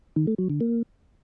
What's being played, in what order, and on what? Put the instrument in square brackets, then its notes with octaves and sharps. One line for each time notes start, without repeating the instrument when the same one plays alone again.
[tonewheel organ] D#3
A3
F#3
D3
A#3